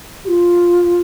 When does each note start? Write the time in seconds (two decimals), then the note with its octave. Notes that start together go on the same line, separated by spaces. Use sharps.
0.24 G4
0.28 F4